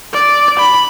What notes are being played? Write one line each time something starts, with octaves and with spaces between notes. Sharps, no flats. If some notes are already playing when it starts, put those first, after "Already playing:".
D5
B5